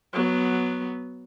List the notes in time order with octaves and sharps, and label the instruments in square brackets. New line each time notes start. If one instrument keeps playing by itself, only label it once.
[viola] F#3 B3